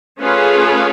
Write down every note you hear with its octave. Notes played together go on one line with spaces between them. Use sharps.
A3 C#4 F4 G#4 B4